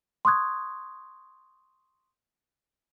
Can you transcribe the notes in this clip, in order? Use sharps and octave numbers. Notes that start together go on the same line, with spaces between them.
C6 C#6 D#6 F#6 G#6